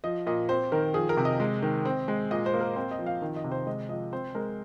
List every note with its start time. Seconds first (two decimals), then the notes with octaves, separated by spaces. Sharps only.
0.04 F3 D#5
0.26 A#2 D#5
0.49 C4 C5
0.72 D#3 A#4
0.94 F3 G#4
1.09 A#4
1.17 C3
1.25 D#5
1.40 G#3
1.62 D#3
1.85 C4
2.08 G#3
2.31 A#2 D#5
2.46 C5
2.53 A#3
2.61 A#4
2.76 C4 C5
2.91 D#5
2.99 F3
3.06 F5
3.22 D#3
3.36 D#5
3.44 C3
3.52 C5
3.67 G#3 D#5
3.89 F3 D#5
4.13 C4 C5
4.35 G#3 A#4